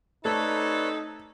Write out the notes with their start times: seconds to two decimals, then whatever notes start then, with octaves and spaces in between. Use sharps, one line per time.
0.25 C3 A3 D#4 A4 B4 C#5 D5